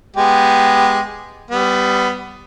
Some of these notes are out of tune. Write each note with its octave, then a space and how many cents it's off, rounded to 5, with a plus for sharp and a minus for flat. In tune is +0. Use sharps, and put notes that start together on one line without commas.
G#3 +0 B3 +0 G4 +0
G3 +0 B3 +20